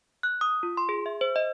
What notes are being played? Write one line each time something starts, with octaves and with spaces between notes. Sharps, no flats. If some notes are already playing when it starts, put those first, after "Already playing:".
F#6
D#6
F4
C6
G#4
E5
C5
D#5